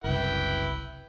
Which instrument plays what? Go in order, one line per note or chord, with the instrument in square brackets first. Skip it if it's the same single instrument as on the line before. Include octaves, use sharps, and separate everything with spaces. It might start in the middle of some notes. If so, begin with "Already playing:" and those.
[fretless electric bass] F#1 C2 [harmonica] E4 B4 G5